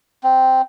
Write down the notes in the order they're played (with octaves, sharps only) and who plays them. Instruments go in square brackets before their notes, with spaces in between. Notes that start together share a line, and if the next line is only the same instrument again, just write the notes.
[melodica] C4